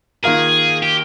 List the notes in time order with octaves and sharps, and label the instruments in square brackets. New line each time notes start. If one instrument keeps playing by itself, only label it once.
[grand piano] D#3 A#3 F4 A#4 [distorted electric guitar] G#4
[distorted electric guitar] G4